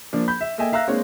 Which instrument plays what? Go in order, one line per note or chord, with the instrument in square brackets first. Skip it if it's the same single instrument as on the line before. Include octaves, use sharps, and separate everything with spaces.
[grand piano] F3 A#3 D4
B5 G6
E5
A#3 A4 D#5 E5 G5 G#5
E5 F5 A#5 E6 F#6 A#6
G#3 A#3 C4 D4 C#5 F5